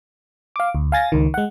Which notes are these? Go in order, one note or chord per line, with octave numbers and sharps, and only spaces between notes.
F5 D6
D2
F5 G#5 A6 A#6
C#2 D#3
G#3 F#5